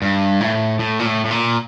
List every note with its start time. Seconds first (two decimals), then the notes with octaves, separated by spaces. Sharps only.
0.02 G2
0.41 A2
0.79 A2
0.99 A#2
1.06 A2
1.25 A2
1.31 A#2